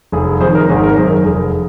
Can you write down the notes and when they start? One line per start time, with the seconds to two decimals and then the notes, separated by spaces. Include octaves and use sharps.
0.12 F1 G#4
0.41 F2 D#3 G#4 C5
0.55 A#4
0.69 G#1 G#4
0.84 A#4
0.97 F#2 D#3 G#4 C5
1.11 A#4
1.25 F1 G#4